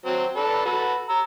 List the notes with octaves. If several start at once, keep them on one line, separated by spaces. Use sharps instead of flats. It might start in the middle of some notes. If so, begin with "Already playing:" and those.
F#3 C4
D4 A4 B4
F#4 A4 B4
A#5 E6